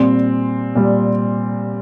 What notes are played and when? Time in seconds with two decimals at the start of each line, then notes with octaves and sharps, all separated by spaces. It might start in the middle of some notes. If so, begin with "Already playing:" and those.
Already playing: A#2 G3 C4
0.75 A#2 G3